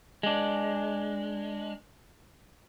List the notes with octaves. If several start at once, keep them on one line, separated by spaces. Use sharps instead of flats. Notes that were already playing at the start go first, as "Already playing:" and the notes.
G#3 D4